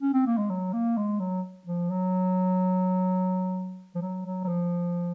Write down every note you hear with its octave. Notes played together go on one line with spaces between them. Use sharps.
C#4
C4
A#3
G#3
F#3
A#3
G#3
F#3
F3
F#3
F3
F#3
F#3
F#3
F3